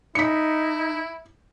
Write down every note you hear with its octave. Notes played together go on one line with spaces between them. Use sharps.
D#4 E4 B6 C#7